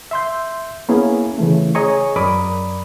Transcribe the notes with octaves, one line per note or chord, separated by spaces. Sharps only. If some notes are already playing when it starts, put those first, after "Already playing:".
E5 C6 G6
A#3 B3 C#4 E4 G#4
C#3 E3 A3
G#4 C#5 D#5 G#5 A#5 C#6
F#2 A#4 D5 B5 D6 D#6